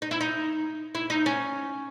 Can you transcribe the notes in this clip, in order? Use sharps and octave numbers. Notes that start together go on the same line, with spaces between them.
D#4
E4
D#4
E4
D#4
C#4